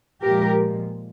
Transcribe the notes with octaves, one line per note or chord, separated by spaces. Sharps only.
A#2 F3 G#3 G4 A#4